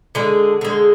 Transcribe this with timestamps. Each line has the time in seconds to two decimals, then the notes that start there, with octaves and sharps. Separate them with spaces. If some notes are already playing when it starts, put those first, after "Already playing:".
0.15 D3 G#3 G#4
0.61 D3 G#3